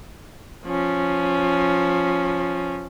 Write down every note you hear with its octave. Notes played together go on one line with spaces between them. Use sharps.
F3 C#4